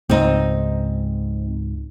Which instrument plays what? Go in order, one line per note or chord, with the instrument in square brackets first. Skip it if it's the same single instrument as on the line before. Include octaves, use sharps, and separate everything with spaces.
[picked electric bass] C#2 G#2 [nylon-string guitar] C4 D#4